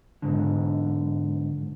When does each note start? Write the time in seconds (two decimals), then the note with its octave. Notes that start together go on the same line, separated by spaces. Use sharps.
0.22 G#2 D3